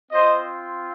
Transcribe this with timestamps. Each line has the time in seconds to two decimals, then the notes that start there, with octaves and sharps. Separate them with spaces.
0.11 C4 F4 C5 D#5